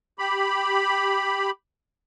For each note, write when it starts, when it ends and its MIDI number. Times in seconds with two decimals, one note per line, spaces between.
0.19 1.51 67
0.19 1.51 83